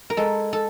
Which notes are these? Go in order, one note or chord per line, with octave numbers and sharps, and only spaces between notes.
A#4
G#3 A4
A4